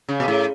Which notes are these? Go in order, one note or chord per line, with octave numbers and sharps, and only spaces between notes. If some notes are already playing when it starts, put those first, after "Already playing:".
C#3
B2
A2